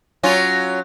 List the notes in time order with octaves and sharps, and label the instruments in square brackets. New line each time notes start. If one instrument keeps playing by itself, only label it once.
[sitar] F#3 C#4 F4